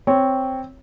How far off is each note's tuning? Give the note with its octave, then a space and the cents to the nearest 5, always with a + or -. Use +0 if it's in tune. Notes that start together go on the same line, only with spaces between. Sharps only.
C4 +0 C#5 +0